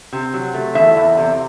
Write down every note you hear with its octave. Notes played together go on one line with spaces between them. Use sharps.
C3
F#3
A3
E2 E5
E2
C3